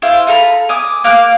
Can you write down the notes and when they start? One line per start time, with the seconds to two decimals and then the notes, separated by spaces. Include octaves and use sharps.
0.02 E4 F4 C5 F5
0.27 F4 A4 A#5 B5
0.69 G#5 D6 D#6
1.04 A#3 F5 D6 F#6